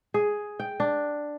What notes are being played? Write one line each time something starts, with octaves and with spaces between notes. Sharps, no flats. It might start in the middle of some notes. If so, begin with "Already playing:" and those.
G#4
G5
D4